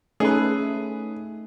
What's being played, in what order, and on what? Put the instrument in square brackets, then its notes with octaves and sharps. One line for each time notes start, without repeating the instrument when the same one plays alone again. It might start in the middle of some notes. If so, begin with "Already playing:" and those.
[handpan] A3 A4 [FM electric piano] C#4 D#4 [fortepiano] G#4 B4